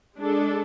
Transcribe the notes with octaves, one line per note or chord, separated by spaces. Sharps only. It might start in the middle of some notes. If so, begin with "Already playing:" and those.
G#3 D4 A4